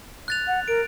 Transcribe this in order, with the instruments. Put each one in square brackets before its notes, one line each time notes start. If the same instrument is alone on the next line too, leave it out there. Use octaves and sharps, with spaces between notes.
[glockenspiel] F#6 A6 F7
[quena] F#5
[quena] A#4 [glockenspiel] D7